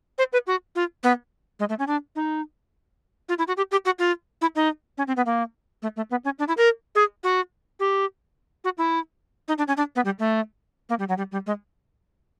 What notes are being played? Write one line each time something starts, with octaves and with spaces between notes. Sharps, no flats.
C5
B4
F#4
F4
B3
G#3
A3
C#4
D4
D#4
F4
E4
F#4
G4
G4
F#4
F4
E4
D#4
C#4
C4
B3
A#3
A3
A3
B3
C#4
D4
E4
A#4
G#4
F#4
G4
F#4
E4
D#4
D4
C#4
D4
B3
G3
A3
A#3
G3
F#3
G3
G3
G#3